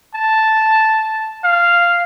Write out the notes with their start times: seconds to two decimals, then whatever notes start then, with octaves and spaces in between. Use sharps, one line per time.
0.15 A5
1.44 F5